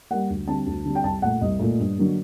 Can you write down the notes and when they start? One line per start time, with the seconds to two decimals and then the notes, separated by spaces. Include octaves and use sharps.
0.11 G3 A#3 F#5
0.30 D2
0.48 D3 G3 C4 A5
0.66 D2
0.85 D3 G3 C4
0.95 G5
1.04 C2 A5
1.22 A#2 A3 F#5
1.41 C2 D#5
1.59 A#2 A3
1.79 G2
1.97 D3 F#3 A#3